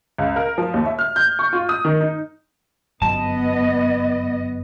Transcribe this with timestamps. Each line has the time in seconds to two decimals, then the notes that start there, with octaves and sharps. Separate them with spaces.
0.18 C#2
0.36 A#4
0.58 F3
0.74 D#2
0.86 E5
0.99 F6
1.16 G6
1.39 C#6
1.53 F4
1.69 D#6
1.85 D#3
2.01 D#4
3.02 G1 F#2 B3 D#5 A5